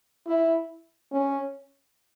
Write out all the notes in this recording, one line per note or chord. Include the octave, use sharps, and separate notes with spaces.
E4
C#4